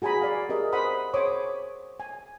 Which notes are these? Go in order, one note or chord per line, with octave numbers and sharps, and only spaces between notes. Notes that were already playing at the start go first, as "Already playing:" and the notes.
F#4 G#4 G#5 A#5 B5
D5 F5
G4 G#4 A#4 D#5 E5
C5 F#5 B5 D#6
G#4 C5 C#5 B5 D6 D#6
G#5